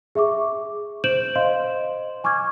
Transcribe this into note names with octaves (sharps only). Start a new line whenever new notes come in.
G#4 E5 C#6 D6
C5 G6 D7 E7 F#7
C5 D#5 F5 C6
G#5 C#6 D6 F6 G#6